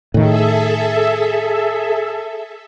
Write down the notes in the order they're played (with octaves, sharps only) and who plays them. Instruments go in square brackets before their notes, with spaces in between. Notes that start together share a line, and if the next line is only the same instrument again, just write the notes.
[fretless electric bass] A2 D#3 [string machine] G#4 A4 E5